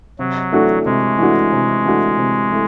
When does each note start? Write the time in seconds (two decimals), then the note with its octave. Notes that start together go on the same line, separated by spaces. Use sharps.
0.19 C3 F#3
0.52 E3 A3 D4 F#4
0.85 C3 G#3
1.18 E3 A3 D4 F#4
1.52 C3
1.84 E3 A3 D4 F#4
2.18 C3
2.51 E3 A3